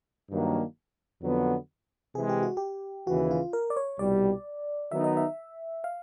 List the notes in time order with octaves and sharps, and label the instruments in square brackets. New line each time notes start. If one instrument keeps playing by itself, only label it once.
[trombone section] G2 D#3 F#3 A#3 D4
F2 D3 F#3 B3
[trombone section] C3 E3 G#3 [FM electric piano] G#4
[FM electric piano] G4
F#4
G4
[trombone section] D#2 C#3 E3 [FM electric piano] F#4
[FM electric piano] F4
A#4
D5
C#5
[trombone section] C2 B2 G3 [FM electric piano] D5
[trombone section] D#3 F#3 B3 D#4 [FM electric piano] E5
[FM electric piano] D#5
E5
F5